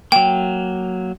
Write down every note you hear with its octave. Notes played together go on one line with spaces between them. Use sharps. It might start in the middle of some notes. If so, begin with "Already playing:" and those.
F#3 A#3 G5